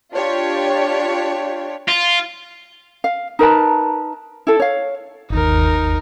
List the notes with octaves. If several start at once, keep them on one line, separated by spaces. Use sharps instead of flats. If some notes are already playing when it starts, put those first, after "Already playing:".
D4 F4 G4 C#5
F4
F5
D#4 A#4 B4 A5
E4 A4
C#5 F5
G1 D#2 D#4 A#4